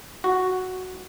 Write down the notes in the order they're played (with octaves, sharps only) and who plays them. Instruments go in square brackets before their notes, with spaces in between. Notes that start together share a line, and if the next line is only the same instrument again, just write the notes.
[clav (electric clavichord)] F#4